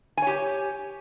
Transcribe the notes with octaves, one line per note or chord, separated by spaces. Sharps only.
G4 C#5 G#5